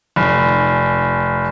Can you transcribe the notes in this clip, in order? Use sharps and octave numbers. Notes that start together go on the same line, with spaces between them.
F1